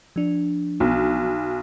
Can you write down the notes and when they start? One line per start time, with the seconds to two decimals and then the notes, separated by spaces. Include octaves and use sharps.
0.16 F3 D4
0.80 B1